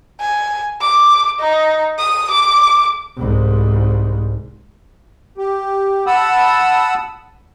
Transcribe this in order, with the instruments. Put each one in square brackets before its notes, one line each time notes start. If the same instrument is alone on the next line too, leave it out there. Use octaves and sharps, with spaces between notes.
[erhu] G#5
D6
D#4
D#6
D6
[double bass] C2 G#2
[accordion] G4
F#5 A5 B5 D#6 E6